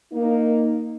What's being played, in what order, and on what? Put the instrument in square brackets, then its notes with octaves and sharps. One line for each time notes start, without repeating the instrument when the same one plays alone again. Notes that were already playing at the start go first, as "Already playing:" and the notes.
[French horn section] A#3 D#4